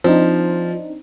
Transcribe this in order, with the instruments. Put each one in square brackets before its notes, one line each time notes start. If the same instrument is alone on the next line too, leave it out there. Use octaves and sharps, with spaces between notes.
[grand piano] F3 [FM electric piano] C4 D4 D#4